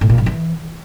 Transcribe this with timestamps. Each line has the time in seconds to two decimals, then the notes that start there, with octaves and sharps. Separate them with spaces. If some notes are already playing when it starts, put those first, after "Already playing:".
0.01 A2
0.10 A#2
0.18 G2
0.26 E3